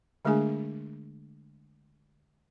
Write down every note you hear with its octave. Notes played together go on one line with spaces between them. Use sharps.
D3 G#3 A3 D4 G#4 G#5